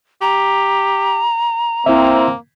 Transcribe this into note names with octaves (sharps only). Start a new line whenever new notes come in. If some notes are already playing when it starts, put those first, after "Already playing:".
G4 A#5
A#3 C4 E4 E5